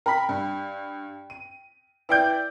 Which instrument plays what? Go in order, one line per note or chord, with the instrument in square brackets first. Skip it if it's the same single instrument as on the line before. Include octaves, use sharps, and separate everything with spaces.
[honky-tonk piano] A#4 B5 [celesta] G5 B6
[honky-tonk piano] G2
D#7
[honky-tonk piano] E4 D5 G6 [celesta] B4 G5 D7